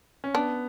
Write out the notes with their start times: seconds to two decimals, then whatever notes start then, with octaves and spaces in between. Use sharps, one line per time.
0.24 C#4
0.34 B3 D4